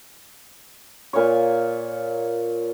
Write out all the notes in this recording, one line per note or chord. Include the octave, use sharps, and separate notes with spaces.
A#2 C#5